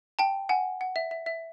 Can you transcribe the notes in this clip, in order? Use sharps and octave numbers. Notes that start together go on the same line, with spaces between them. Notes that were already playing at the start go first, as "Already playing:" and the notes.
G5 A5
F#5 G#5
F#5
E5
E5
E5